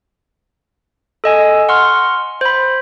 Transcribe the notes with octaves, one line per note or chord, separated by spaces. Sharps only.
A4 D#5 G#5
F#5 C6 C#6 F6
C5 B5